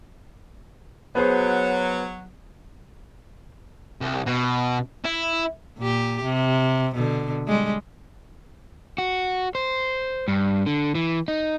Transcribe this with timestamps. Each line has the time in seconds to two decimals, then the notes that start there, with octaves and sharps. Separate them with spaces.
1.15 F#3 B3 G#4 C5
4.01 C2
4.27 B2
5.05 E4
5.79 A#2 G4
6.23 C3
6.95 B2 D3
7.47 G3 G#3
8.98 F#4
9.55 C5
10.28 G2
10.66 D3
10.95 E3
11.28 D#4